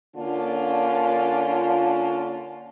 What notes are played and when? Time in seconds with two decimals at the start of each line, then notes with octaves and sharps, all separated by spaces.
0.16 D3 A#3 C#4 D4 F4